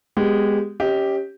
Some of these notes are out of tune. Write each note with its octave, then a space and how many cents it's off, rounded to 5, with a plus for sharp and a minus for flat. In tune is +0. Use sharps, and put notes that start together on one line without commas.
G#3 -10 B3 +10 G4 -5
C#4 +0 G4 +0 D#5 +25